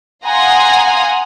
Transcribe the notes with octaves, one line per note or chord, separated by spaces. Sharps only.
F5 F#5 G#5 A#5 C6 D#6